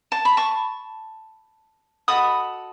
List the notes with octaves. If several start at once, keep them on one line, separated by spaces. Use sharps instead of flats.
A5
B5
A5 C#6
F#4 A4 D#5 B5 D#6